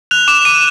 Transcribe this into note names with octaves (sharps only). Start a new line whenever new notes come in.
F#6 F7
D6 E7
D6 D#7